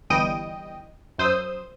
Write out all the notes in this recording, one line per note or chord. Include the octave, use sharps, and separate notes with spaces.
G1 E3 G3 D#5 G5
F#2 C5 D#6 E6